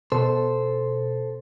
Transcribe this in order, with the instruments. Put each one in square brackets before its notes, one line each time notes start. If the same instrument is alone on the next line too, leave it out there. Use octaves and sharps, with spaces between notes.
[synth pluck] B2 [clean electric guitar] A4 C5